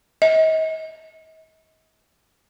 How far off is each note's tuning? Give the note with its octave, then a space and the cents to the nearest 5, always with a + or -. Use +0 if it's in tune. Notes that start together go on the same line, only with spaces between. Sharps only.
D#5 +40